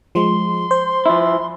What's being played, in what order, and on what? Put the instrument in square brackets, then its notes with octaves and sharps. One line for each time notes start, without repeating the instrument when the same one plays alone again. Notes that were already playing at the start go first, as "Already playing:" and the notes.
[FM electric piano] F3 G#3 [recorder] C6
[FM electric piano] C5
[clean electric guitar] F3 E4